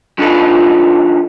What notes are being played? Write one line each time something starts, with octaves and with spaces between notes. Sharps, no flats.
F3 D4 D#4 F4 A4 B4